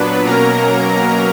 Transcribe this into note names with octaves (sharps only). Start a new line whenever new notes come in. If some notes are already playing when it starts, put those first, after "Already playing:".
Already playing: A#2 F#3 B3 D4 B4
B2 F#3 A#3 C#4 A#4 A#5